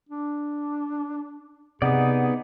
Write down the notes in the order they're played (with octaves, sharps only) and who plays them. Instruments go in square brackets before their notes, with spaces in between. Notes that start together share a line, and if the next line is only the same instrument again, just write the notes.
[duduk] D4
[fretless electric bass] C3 [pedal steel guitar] B3 D#4 D5 [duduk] G#4 [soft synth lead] F#5